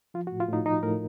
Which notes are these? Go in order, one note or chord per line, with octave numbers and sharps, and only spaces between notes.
F3 F4
F#4
A2
F4
A2 D#4
F3 D#4
A2 A#4